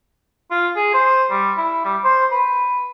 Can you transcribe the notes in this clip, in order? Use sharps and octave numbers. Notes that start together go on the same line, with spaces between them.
F4
G#4
C5
G3
E4
G3
C5
B4